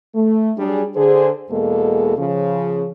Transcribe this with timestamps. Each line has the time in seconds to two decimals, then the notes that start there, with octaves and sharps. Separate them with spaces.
0.15 A3
0.58 F#3 G3 D4 G#4
0.95 D3 G#4 C5
1.50 E2 B2 G#3 A#3 A4
2.18 C#3 F3